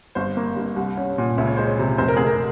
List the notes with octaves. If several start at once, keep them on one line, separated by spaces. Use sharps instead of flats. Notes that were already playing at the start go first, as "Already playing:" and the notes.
G1 C5
A#3
G2
C2
C#4
A#2
C#2 E5
C#5
G#3 C5
C#5
C3
F1 C5
A#4
F1 G#4
A#4